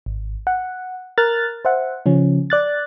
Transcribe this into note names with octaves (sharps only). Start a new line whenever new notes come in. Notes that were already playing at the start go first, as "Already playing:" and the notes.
G#1
F#5
A#4 F6 F#6 A6
C5 E5 F#5
C#3 F3 C#4
D5 F#6 A6